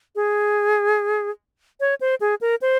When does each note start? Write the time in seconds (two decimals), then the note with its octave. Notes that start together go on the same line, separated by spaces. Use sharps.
0.15 G#4
1.80 C#5
2.01 C5
2.20 G#4
2.41 A#4
2.61 C5